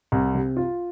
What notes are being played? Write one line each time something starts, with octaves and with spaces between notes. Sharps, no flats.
C2
C3
F4